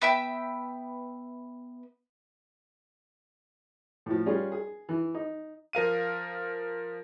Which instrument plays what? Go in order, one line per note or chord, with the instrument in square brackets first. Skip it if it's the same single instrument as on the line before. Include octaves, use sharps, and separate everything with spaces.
[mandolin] B3 E5 G5 E6
[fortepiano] A2 F3
G3 C#4 F4 G#4 D5
G#4
E3
D#4
[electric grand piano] F3 A#4 F5 D#7